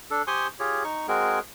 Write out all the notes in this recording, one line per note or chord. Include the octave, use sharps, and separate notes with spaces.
D4 A4
G4 C5 G#5 C6 C#6 D#6
F4 G4 G#4 C#5
D#4 C#6
G#3 C4 F#4 G#4 A#4